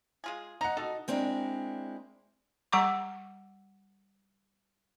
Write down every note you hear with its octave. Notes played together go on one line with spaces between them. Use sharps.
G#3 F4 G#4
D#4 F#5 A#5
D#4 F#4 A4
G#3 C4 D4 E4 A#4
G3 F#5 A#5 C#6 D6